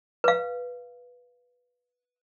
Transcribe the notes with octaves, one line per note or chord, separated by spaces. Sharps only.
B4 F5